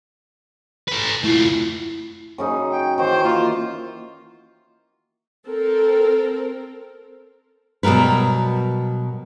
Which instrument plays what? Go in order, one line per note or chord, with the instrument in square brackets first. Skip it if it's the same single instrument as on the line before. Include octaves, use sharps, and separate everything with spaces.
[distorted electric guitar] A4 B4
[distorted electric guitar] A3 F4 [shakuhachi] E4
[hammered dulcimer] F#2 C#3 D#4
[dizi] G5
[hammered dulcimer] D#3 E3 F#4 [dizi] C5
[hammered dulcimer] A#3 [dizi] F4
[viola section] C4 A4 A#4
[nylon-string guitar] B2 F#3 G3 A#4 B4